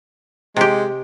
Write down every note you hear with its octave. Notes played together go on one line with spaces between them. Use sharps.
C3 G#3 G4